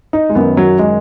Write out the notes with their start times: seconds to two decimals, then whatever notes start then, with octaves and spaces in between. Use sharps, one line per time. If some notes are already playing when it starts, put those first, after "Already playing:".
0.13 D#4
0.29 G#3
0.35 F#2 D#3 B3
0.57 F#3
0.79 G#3